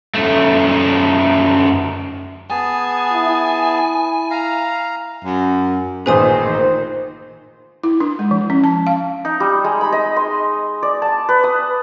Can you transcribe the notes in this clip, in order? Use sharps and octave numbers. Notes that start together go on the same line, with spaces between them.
F#2 A3
B3 G#4 G#5 A5
E4
F5 A#5
F#2
A1 A#2 D#3 G#4 B4 C5 G#5 D#6
E4
D4
G#3
F3
C#4
A5
F5
D#4
G3
G#3
B5
D#5
C6
D5
A5
B4
D#6